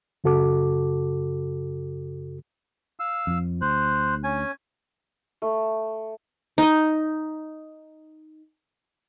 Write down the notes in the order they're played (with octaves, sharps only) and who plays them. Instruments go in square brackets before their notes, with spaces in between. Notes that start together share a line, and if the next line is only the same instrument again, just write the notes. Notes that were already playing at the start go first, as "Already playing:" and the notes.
[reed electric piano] F#2 C#3 F#4 A4 D6
[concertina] F5 E6
[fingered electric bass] F2 F3
[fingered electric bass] D2 [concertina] C5 F#6
[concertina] C#4 G#5
[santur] A3
[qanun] D#4 D#5